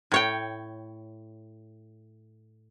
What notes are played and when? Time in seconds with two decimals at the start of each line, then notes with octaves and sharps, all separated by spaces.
0.12 A2 C#5 G5